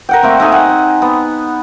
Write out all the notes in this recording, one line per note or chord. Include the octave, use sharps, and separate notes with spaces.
A#4 F#5 G5
A3 A#3 C4
A3 D#4 G#4 G#5
F#5
C4
B3